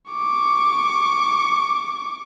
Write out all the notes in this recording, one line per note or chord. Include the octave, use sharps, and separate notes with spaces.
C#6 D6